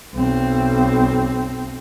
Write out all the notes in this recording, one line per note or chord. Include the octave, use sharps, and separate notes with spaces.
B1 C4